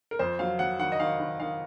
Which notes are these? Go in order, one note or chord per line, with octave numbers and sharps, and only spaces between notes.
A#4
F2 C5
F#3 F5
F#3 F#5
D#3 F#5
D#5
D#3 F5
D#3
D#3 F5